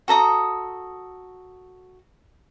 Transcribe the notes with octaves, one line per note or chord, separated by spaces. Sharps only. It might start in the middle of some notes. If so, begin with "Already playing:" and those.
F#4 A4 A#5 D#6